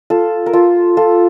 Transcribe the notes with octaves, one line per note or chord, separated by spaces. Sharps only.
F4 A4
A#4
F4 A4
F4 A4